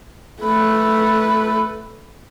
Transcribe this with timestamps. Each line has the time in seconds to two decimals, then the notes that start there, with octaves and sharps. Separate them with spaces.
0.41 A3 B4